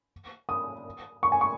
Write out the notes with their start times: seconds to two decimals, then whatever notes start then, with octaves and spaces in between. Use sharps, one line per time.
0.49 D#6
1.23 C#6
1.32 G#5
1.41 C#6